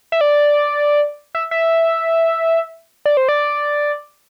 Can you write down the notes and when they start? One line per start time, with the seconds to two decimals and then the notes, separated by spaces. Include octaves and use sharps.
0.12 E5
0.21 D5
1.35 E5
1.51 E5
3.05 D5
3.17 C5
3.29 D5